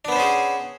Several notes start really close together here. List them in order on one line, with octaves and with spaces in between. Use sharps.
D4 B3 C5 C#4 G#4